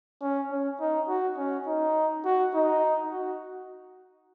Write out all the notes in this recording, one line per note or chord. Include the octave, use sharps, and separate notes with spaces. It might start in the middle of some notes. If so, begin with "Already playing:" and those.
C#4
C#4
D#4
F#4
C#4
D#4
F#4
D#4
F#4